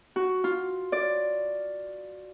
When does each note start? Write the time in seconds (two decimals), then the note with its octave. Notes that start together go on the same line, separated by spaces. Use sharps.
0.16 F#4
0.44 F4
0.92 D5